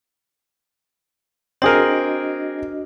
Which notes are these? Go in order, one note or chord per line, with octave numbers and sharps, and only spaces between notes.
C4 D4 F#4 G#4 A#4 D#5